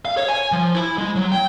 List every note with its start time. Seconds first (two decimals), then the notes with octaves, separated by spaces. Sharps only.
0.05 F5
0.17 C#5
0.28 G#5
0.52 F3
0.75 E4
0.98 G#3
1.15 F#3
1.32 G5